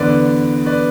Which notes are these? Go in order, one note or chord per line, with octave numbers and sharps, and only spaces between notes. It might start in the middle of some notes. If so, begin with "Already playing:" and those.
Already playing: E2 D3 B4 D5
B4 D5